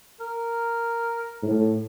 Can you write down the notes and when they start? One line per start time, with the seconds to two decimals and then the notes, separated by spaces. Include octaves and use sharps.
0.20 A#4
1.43 A2